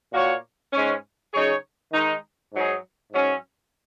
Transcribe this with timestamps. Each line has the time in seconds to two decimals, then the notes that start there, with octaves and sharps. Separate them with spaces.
0.12 A#2 A#3 F#4 C#5
0.73 G#2 G#3 C#4
1.33 C#3 F#3 D#4 G#4 C#5
1.93 D#3 G#3 D#4
2.53 G#2 F#3 D#4 G#4
3.13 G#2 F#3 C#4